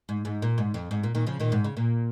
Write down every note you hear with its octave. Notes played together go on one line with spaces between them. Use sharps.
G#2
G#2
A#2
G#2
F2
G#2
A#2
A#2 D#3
C#3 F3
A#2 D#3
G#2
C#3
A#2